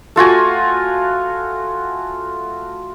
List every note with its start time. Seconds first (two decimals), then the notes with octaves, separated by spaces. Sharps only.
0.16 A3 F4 F#4 G#5